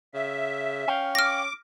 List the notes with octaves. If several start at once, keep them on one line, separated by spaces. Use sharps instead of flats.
C#3 E5
C#4 F5 G5
D6 F6 A#6